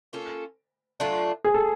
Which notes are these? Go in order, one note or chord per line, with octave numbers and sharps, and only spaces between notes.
A#3 C#4 F4 A4
F#3 A3 D4 F4
G#4
A4